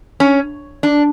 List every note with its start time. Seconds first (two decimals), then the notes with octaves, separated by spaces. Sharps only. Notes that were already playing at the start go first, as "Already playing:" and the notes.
0.20 C#4
0.83 D4